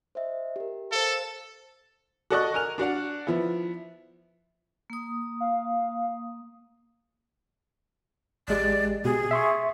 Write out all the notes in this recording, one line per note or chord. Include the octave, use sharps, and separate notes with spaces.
C5 D#5 E5
G4 A#4
A4 C5 F5
F#4 A4 D5 D#5 C#6 F#6
A#4 G#5 F6 F7
D4 F#4 D5 F#5
F3 B3 E4
A#3 D#6
F5
A1 G#3 G4 D5
B2 G4 G#4
E5 C6 C#6